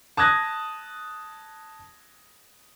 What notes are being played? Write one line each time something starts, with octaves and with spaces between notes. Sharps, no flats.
A5 D#6 F#6 G#6 A#6